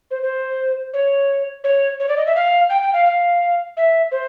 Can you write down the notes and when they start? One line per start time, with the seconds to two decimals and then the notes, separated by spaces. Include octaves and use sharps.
0.11 C5
0.22 C5
0.93 C#5
1.64 C#5
2.00 C#5
2.08 D5
2.17 D#5
2.26 E5
2.36 F5
2.70 G5
2.82 G5
2.93 F5
3.06 F5
3.77 E5
4.12 C5